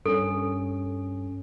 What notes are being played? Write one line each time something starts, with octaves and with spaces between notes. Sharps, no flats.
G2 C#4 A4